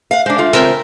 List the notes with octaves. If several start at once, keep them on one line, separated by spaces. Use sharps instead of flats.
F5 F#5
G#3 D4 C5
A3 F4
C#3 G#3 C4 A#4 E5 G5